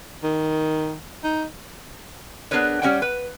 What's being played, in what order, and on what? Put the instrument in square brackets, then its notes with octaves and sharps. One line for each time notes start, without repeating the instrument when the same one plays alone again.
[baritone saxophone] D#3
D#4
[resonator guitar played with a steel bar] B3 D4 G#4 A#4 B4 C#5
G3 C#4 C5 C#5 F#5 G5
B4